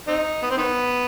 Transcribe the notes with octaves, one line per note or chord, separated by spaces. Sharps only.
C4 D#4
B3
C4
D#3 B3